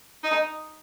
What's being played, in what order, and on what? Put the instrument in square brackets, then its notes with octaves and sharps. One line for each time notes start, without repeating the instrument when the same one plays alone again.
[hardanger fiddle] D#4